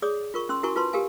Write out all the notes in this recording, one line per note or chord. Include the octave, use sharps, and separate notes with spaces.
G#4 C#5 D5 D#6
F4 A#4 C#6
C#4 C6 E6
E4 F#4 A#4 G#5 C#6
F4 B4 A5 C6
G4 A#4 F5 G#5